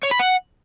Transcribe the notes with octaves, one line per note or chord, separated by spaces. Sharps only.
C#5
B5
F#5